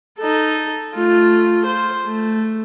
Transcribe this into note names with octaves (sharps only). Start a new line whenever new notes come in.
D#4 A4
A3 F4
C5
A3